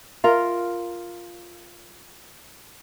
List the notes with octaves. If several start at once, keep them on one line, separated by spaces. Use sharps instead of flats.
F4 A#4